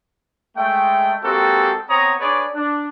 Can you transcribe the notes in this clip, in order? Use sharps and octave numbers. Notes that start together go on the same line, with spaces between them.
G#3 A3 G5
G#3 A#3 C4 F#4 G4 A4
B3 C4 C#5 A#5 D#6
D4 G#4 B4 C#5 D5 D6
D4